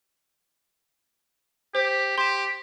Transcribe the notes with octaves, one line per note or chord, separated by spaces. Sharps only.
G4 C5
G4 C6 E7